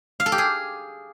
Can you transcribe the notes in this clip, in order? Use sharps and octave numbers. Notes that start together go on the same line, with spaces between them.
F5
A4
G4
G#4